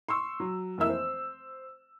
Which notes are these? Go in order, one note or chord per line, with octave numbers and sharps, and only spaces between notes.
C6 C#6 E6
F#3
F1 E3 A#3 E5 E6
C5